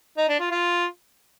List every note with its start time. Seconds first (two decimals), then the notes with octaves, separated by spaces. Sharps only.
0.17 D#4
0.29 D4
0.40 F4
0.51 F4